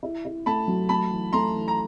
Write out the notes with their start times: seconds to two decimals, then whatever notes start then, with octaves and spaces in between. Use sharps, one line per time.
0.03 E4
0.25 E4
0.46 A3 A5 B5
0.68 F#3
0.89 A3 A5 B5
1.11 E3
1.33 A3 A#5 C6
1.55 E3
1.68 A#5